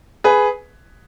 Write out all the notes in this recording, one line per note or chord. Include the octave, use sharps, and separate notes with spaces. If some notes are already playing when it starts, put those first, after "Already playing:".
G#4 B4